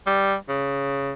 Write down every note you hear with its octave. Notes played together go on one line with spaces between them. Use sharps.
G3
C#3